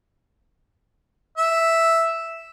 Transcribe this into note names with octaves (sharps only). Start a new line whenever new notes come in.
E5